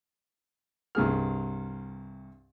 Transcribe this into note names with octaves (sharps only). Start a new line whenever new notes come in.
C2 G2 G#4 F6